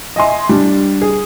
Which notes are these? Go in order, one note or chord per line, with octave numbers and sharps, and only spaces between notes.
D#5 E5 G#5 C6
G3 D4
G#4